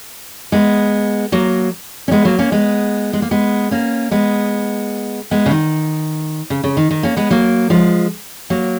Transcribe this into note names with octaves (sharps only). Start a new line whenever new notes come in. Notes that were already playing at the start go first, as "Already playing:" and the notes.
G#3 B3
F#3 A#3
C#4
G#3 B3
F#3 A#3
A#3 C#4
G#3 B3
G#3
A#3
G#3 B3
A#3 C#4
G#3 B3
G#3 B3
C#3
D#3
C#3
C#3
D#3
D#3
A#3 C#4
G#3 B3
F#3 A#3
F3 G#3
F#3 A#3